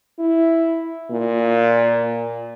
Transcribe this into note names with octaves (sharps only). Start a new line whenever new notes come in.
E4
A#2